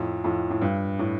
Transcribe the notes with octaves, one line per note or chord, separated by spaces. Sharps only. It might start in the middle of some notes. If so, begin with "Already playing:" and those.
Already playing: F2 A2
F2 A2
A2
G2
A2